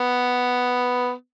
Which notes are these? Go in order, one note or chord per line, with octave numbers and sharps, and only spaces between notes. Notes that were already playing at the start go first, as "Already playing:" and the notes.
Already playing: B3